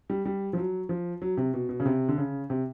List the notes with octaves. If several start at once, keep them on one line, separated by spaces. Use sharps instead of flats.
G3
G3
F3
F#3
F3
F#3
C3
B2
B2
C#3
C3
D3
C#3
C3